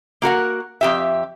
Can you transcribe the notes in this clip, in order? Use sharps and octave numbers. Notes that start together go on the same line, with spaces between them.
A#3 F#4 A#4 F#5
F2 G4 E5